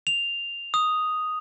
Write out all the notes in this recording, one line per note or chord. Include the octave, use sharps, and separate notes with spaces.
F7
D#6